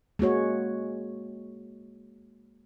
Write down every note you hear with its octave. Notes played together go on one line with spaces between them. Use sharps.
G#3 A#3 F#4 C#5